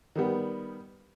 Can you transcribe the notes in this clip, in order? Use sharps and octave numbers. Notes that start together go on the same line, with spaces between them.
D#3 G3 B3